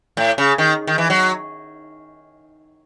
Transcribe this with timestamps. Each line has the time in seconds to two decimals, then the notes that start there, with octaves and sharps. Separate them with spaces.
0.17 A2
0.38 C#3
0.58 D#3
0.87 D#3
0.98 E3
1.10 F#3